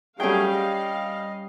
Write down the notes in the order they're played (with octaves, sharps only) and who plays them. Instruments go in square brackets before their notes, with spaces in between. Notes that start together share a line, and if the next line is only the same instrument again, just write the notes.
[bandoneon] F#3 A3 G#4 [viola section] G3 F5 [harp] C#4 G5
[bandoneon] D#5